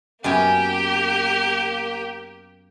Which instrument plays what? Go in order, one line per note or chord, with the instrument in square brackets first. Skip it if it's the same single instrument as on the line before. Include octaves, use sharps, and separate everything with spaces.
[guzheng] F#2 B3 G#5 [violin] A#3 G4